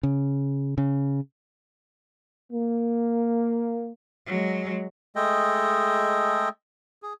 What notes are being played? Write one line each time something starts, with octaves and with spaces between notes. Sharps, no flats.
C#3
C#3
A#3
F#3 G#3
G#3 A3 G#4 A4 D#5 G5
G#4